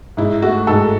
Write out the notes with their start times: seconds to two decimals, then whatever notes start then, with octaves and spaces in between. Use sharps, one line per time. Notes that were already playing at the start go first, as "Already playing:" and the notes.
0.17 G#2 E4
0.42 A3 F#4
0.67 G#2 A4